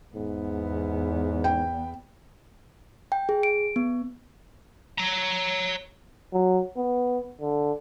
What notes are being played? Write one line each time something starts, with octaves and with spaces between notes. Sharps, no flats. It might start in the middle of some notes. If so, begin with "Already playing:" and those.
E2 G#2 B3
G5
G5
G#4
D7
B3
C#5 A#5
F#3
B3
D3